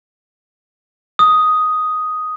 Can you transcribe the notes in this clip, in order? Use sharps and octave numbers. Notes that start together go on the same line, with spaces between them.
D#6